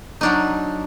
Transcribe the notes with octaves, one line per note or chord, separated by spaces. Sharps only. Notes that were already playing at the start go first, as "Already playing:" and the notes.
F#3 D4 D#4